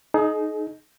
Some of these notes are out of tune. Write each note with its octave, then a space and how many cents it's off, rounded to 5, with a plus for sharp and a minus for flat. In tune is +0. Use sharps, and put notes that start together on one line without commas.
D#4 +0 G#4 +40